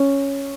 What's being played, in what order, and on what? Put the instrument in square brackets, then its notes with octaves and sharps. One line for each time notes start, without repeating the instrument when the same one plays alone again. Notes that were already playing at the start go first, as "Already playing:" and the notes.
Already playing: [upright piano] C#4